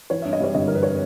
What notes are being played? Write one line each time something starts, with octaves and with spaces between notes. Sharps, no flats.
E3 C#5
G2 E5
D#5
G3 C#5
G1 D#5
E3 A#4
B4
C#5